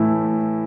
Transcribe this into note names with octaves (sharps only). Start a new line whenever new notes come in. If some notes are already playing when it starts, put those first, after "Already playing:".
Already playing: A2 E3 A3 E4